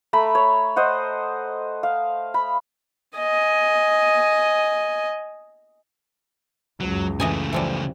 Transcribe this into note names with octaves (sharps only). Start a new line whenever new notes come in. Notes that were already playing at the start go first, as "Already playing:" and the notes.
A3 A#5 B5
C#5
C5 D#5 F#5
F5
B5
D#5 G#5
C#2 F#2 F#3
C#3 E3 A3 D#5 G#5
E3 F3 G3